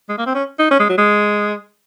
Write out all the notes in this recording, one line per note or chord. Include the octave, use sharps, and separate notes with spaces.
G#3
A#3
C4
C#4
D#4
C#4
G#3
F#3
G#3